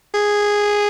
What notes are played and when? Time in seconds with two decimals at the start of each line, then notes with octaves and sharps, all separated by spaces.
0.14 G#4